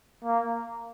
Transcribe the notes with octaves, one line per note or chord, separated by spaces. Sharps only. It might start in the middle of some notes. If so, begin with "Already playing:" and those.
A#3